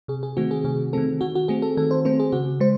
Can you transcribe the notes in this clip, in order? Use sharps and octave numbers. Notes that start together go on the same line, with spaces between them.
C3 G#4
G#4
D#3 A3 C4 F#4
G#4
C3 G#4
D#3 A3 C4 A4
D#3 F#4
F#4
A3 C4 G#4
A4
D#3 A4
C5
A3 C4 C5
G#4
C#3 F#4
G#3 C5